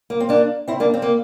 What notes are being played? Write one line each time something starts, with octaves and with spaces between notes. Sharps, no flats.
A#3
C4
A#3 D4
C4 E4
A#3 D4
C4
A#3